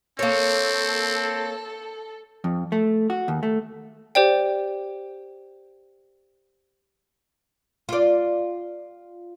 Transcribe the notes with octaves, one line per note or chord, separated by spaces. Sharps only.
A#3 C4 A4 C#5
F2
A3
F#4
D#2
A3
G4 C5 D5 G5
F4 D5